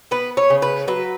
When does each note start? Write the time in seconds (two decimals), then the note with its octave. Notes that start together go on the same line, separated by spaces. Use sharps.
0.11 B3 B4
0.37 C#5
0.50 C#3
0.62 B4
0.88 F#3 B4